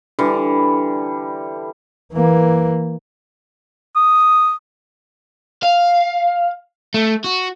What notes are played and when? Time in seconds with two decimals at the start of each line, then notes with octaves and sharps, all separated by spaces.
0.19 D3 E3 G3
2.13 E3 A#3
3.96 D#6
5.63 F5
6.94 A3
7.24 F#4